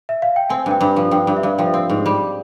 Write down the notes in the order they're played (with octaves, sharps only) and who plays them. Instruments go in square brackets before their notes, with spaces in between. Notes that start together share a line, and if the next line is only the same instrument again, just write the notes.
[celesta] E5
F5
G5
[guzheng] C4 [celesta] G#5
[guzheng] G2
[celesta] G5
[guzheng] G2
F3
[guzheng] G2 [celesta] G5
[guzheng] G2
[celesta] E5
[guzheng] G2 [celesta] F5
[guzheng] F3 [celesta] G5
[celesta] E5
[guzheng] C4 [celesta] F5
[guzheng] G#2
G3